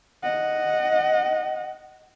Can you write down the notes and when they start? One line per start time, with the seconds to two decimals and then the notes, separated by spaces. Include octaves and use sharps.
0.23 D#5 F#5